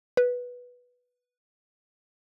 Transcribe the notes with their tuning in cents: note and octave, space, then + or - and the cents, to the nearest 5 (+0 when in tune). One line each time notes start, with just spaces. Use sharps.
B4 -10